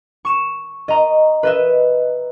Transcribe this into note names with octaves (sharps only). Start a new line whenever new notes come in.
C#6 E7
D#5 A#5
B4 D#5 E5